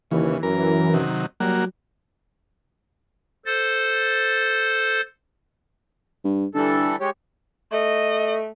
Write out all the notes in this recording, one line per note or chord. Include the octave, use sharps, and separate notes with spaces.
D#2 C#3 E3
F#2 A#4
C3 D#3 F#3
F#3 G3 A#3 F#4
A4 C5 A6
G2
D3 E3 G3 A4
G#3 G4 C#5
A3 D#5